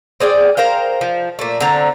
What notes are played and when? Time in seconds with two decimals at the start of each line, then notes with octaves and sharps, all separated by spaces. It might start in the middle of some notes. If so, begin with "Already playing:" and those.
0.20 C4 G#4 D5 G5
0.57 A#4 C5 F5 G5
1.01 F3
1.39 A#2 A3
1.60 D3 C4 A#5